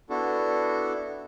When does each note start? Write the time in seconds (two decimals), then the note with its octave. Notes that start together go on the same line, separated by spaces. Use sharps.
0.10 B3 D4 E4 F#4 A4